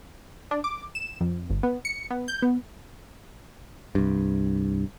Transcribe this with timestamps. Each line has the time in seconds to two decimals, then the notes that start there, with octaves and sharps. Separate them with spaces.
0.51 D4
0.64 D6
0.95 E7
1.21 F2
1.50 G1
1.63 B3
1.85 C#7
2.10 B3
2.28 G6
2.42 B3
3.95 C2 G2